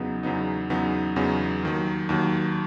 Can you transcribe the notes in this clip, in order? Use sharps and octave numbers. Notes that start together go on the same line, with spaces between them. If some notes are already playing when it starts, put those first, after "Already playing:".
Already playing: E2 C#3 F#3 B3 D#4
E2 C#3 F#3 B3 D#4
E2 C#3 F#3 B3 D#4
E2 C#3 F#3 B3 D#4
D#2 D#3 F#3
D#2 D#3 F#3